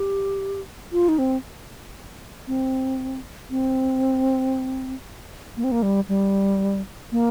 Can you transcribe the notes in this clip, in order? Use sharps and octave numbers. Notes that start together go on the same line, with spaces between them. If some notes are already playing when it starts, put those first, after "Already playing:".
Already playing: G4
F4
D#4
C4
C4
C4
A#3
C4
A#3
G3
G3
A#3